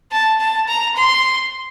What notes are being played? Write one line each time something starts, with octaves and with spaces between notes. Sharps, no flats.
A5
A5
A#5
C6